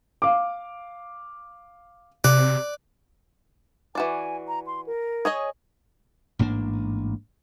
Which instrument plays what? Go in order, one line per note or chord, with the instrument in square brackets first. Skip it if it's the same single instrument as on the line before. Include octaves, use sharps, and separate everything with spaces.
[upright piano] F5 D6
[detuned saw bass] C3 [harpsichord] D5 [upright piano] F#6
[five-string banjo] E3 F#4 D5 [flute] G#5
[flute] A#5
C6
A#4
[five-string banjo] G#4 C#5 D#5
[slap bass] A1 G#2 A#3 D4